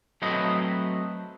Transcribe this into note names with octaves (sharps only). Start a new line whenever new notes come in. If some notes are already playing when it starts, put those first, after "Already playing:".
F#3 A3 C4 B4 D#5